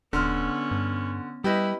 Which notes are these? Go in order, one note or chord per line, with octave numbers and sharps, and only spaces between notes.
D#1 D3 B3 C#4 C6 F6
G2
G3 E4 G4 B4 D#5